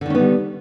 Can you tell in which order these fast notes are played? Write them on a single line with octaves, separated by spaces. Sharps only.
D3 D#3 C#4 B3 G3